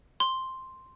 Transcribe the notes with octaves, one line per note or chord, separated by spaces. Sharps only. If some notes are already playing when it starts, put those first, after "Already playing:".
C6